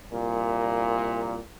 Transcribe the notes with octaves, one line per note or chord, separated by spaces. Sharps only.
C2 A#2